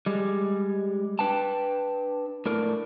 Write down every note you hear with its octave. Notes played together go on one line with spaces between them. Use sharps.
G3 G#3
D4 B4 G5 A5
A2 D4 A#4